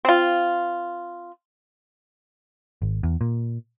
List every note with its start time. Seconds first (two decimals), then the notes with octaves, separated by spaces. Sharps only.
0.05 C4 F4
2.82 G#1
3.03 E2
3.21 A#2